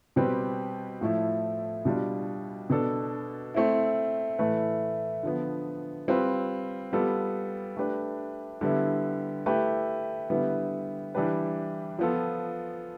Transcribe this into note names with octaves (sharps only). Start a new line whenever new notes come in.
B2 G3 C4 G4 B4
A2 F3 A3 E4
B2 G3 D4 F4
B2 B3 D4 A4
A3 C4 E4
A2 E3 A3 E4 B4
D3 F3 B3
G3 C4 F4 B4
G3 B3 F4 A4
A3 D4 G4 B4
D3 G3 B3 E4
A3 E4 G4 B4
D3 G3 B3 E4 B4
E3 G3 D4 G4 B4
F3 B3 F4 A4